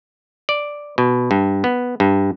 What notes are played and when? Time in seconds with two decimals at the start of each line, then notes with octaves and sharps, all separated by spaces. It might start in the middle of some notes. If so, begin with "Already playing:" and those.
0.49 D5
0.98 B2
1.31 G2
1.64 B3
2.00 G2